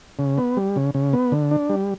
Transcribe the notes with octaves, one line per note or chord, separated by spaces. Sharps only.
C#3
B3
G3
C#3
C#3
B3
D3
D4
G3